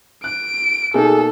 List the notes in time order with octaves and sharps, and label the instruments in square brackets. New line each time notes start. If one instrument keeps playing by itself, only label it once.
[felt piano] F#6 [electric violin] D7
[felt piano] B2 A#3 D#4 [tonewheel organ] G#4 [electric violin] A4